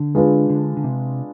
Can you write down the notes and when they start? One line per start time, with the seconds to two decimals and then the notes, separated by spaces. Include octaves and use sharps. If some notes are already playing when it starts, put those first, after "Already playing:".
Already playing: D3
0.15 G#3 D4 F4 B4
0.50 D3
0.77 D3
0.84 C3